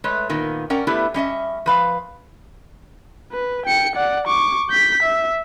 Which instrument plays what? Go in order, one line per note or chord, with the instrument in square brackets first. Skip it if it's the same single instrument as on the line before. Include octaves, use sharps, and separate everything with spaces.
[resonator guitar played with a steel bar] G#3 A3 B4 C#5
A#2 D#3 A#3 B3
C#4 A#4 D5 F#5 G5
A3 B3 D4 E4 G4 B4
G3 C#4 D#5 E5
F3 B4 F5
[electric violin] B4
G5 C#7
D5 F#5
C#6 D6
G6 B6
E5